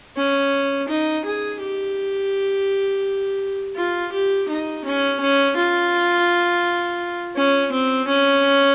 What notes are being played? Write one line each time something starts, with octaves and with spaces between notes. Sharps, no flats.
C#4
D#4
G#4
G4
F4
G4
D#4
C#4
C#4
F4
C#4
C4
C#4